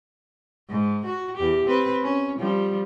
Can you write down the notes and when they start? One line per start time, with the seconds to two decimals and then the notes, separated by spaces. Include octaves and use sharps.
0.69 G#2
1.06 F#4
1.37 E2 G4
1.66 C4 B4
2.03 C#4
2.39 F3 G3